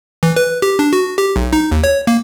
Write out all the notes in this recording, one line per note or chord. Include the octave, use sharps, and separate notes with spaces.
E3
B4
G4
D4
F#4
G4
B1
D#4
D#2
C#5
A#3